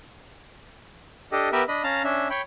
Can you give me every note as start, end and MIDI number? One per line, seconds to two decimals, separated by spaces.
1.32 1.49 62
1.32 1.49 67
1.32 1.49 69
1.32 1.49 75
1.52 1.63 59
1.52 1.63 67
1.52 1.63 70
1.52 1.63 71
1.52 1.63 76
1.68 1.83 62
1.68 1.83 75
1.68 1.83 83
1.84 2.02 61
1.84 2.02 77
1.84 2.02 81
1.84 2.02 82
2.04 2.28 61
2.04 2.28 62
2.04 2.28 76
2.30 2.41 73
2.30 2.41 79
2.30 2.41 83